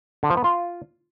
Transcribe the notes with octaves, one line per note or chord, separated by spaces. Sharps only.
D3
F3
B3
F4